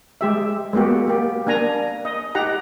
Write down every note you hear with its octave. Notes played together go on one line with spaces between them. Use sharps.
G#3 G4 E5
G#3 A#3 B3 F#4 G4
A#3 G4
A#3 D4 G#5 A#5
D#5
D#4 G4 F#5 A#5